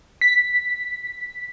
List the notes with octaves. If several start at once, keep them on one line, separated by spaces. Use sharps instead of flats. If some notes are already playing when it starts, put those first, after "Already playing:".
B6